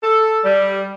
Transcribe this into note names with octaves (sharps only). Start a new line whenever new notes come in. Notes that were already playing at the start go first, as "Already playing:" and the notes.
A4
G3